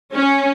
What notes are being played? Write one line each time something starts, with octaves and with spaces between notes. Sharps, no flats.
C#4